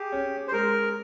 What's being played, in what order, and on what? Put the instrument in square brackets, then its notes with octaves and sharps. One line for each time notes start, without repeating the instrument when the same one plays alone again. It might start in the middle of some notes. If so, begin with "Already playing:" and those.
Already playing: [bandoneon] G4 [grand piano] G#4
[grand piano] C#4
[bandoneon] C5
[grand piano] G#3 [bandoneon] A#4